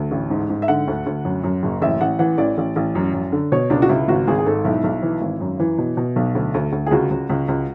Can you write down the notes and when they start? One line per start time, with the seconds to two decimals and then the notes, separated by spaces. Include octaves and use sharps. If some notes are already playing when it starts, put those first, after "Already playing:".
Already playing: D2
0.11 A1
0.30 G#2
0.50 G#2
0.62 E5
0.68 D3 F#5
0.88 D2
1.06 D2
1.25 F#2
1.44 F#2
1.63 F#1
1.82 A1 E5
2.01 A1 F#5
2.19 E3 F#5
2.38 A1 D5
2.58 A1
2.76 A1
2.95 F#2
3.14 F#2
3.32 D3
3.52 B2 C#5
3.70 C#2 D4
3.82 F#4
3.89 C#2 E4
4.08 G#1 F#4
4.27 G#1 G#4
4.39 G#4
4.46 G#2 A4
4.65 B1 E4
4.84 B1
5.03 E3
5.21 G#1
5.41 F#2
5.60 E3
5.78 B2
5.97 B2
6.16 B1
6.35 D2
6.54 D2
6.72 D2
6.86 G#4
6.91 C#2 F#4
7.10 C#2
7.30 C#2
7.48 C#2